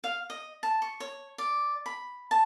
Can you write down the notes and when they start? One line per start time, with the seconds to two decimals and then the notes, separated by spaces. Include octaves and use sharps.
0.04 F5
0.30 D#5
0.63 A5
0.82 C#6
1.00 C#5
1.38 D5
1.86 B5
2.31 A5